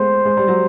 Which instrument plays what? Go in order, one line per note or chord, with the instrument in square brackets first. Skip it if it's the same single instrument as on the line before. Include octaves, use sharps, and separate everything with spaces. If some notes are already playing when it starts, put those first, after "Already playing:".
Already playing: [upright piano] G#3 A3 B3 [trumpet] C5
[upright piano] G#3
G3
F#3